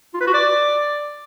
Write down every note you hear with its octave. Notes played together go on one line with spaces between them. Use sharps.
F4
B4
F#4
D5